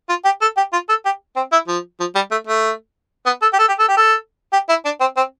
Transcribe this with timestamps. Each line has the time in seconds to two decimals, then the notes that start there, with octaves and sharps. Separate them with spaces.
0.09 F4
0.25 G4
0.41 A4
0.57 G4
0.72 F4
0.89 A4
1.05 G4
1.36 C4
1.52 E4
1.68 F3
2.00 F3
2.15 G3
2.31 A3
2.47 A3
3.26 B3
3.42 A4
3.53 G4
3.58 A4
3.68 G4
3.79 A4
3.88 G4
3.97 A4
4.52 G4
4.69 E4
4.85 D4
5.00 C4
5.16 C4